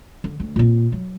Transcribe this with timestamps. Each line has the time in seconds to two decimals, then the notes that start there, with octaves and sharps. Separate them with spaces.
0.24 D3
0.40 D2
0.56 A#2 C4
0.92 F#3